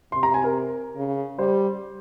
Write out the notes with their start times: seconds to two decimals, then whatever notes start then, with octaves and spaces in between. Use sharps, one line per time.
0.12 C3 C6
0.23 A#5
0.34 G#5
0.44 A#4
0.96 C#3
1.38 G3 C5